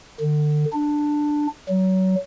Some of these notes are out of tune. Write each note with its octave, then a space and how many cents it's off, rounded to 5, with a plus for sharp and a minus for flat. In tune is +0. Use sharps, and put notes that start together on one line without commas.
D3 +35
D4 +10
F#3 +25